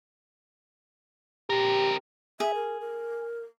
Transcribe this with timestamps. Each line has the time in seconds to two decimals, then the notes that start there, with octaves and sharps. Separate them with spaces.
1.50 C4 G4 A#4
2.40 G#4 E5
2.55 A#4
2.80 A#4